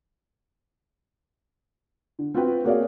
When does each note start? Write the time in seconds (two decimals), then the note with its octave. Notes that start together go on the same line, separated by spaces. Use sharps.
2.19 D3
2.34 C4 F4 F#4 B4 G5
2.64 A#3 F#4 G#4 C#5 D5 F5